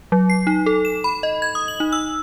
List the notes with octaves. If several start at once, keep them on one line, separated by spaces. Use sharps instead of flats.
F#3
C7
D#4
A4
E7
B5
D#5
G#6
D#6
F#7
D#4
E6